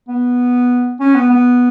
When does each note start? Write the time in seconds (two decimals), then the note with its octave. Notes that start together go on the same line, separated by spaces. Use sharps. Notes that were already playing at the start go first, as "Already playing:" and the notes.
0.08 B3
1.00 C#4
1.15 B3
1.30 B3